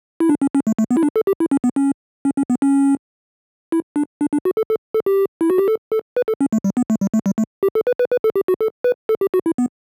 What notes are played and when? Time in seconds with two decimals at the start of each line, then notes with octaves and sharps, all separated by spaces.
0.20 E4
0.29 D4
0.42 C#4
0.55 C#4
0.67 A3
0.79 A3
0.91 B3
0.97 E4
1.03 D4
1.16 A4
1.27 G4
1.40 E4
1.51 C#4
1.64 B3
1.76 C#4
2.25 C#4
2.37 C#4
2.50 B3
2.62 C#4
3.72 E4
3.96 D4
4.21 D4
4.33 D4
4.45 F#4
4.57 A4
4.70 A4
4.94 A4
5.06 G4
5.41 E4
5.50 F#4
5.58 G4
5.68 A4
5.92 A4
6.16 B4
6.28 A4
6.41 C#4
6.53 A3
6.64 G3
6.77 B3
6.90 A3
7.01 G3
7.14 A3
7.26 G3
7.38 A3
7.63 G4
7.75 A4
7.87 B4
7.99 B4
8.12 B4
8.24 A4
8.36 G4
8.48 F#4
8.61 A4
8.84 B4
9.09 A4
9.21 G4
9.34 F#4
9.46 E4
9.58 B3